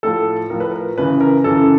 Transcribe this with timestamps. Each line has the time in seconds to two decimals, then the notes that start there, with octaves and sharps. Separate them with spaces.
0.03 A2 F3 A4
0.50 A2 F3 A#4
0.60 B4
0.72 A#4
0.98 F#2 C#3 E3 B4
1.21 A#4
1.44 F#2 C#3 E3 A4